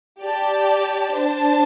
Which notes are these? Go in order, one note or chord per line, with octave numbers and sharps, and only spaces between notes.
G4 D5 A5
D4 C5 A5